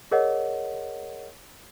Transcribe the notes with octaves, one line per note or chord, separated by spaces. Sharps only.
G#4 A#4 C#5 D#5 F#5